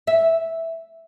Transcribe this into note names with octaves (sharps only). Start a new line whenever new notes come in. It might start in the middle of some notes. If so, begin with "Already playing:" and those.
E5